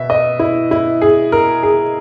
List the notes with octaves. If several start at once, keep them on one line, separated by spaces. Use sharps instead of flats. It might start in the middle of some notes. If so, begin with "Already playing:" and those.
Already playing: B2 E5
D#5
E4
E4
G#4
A#4
G#4